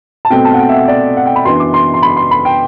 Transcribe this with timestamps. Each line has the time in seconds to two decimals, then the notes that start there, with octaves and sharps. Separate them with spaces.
0.25 A5
0.30 B2 A3 C4 G5
0.45 A5
0.54 F#5
0.59 G5
0.69 E5
0.73 F#5
0.88 D5
1.17 F#5
1.26 G5
1.36 B5
1.45 F#2 E3 B3 D4 C6
1.60 D6
1.74 C6
1.94 C6
2.03 B5
2.16 C6
2.31 B5
2.45 G5